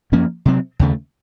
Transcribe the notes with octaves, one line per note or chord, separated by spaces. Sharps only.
F#2 F3 A#3 C#4
C3 F#3 C4
D#2 C#3 A3